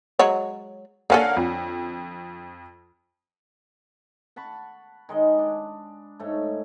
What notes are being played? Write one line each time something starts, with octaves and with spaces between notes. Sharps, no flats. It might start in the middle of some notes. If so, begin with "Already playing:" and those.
F#3 G#3 C#5
D3 A#3 C#4 A4 F5 F#5
F2
F#5 A5 B5 C#6
D#3 G#3 D#5
D4
G#2 A3 C#5